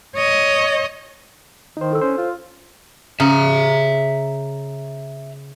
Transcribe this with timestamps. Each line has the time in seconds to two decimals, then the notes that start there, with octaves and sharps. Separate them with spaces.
0.16 C#5 D#5
1.77 D#3 D#4 C5
1.90 E4 A4 E6
2.01 C#4 C5
2.18 F4
3.20 C#3 E5 A#5